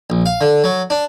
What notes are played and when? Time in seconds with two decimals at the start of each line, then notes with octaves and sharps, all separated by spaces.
0.10 A#1
0.26 F5
0.41 D3
0.64 F#3
0.90 D4